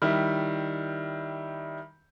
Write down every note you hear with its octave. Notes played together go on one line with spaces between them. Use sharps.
D#3 G3 E4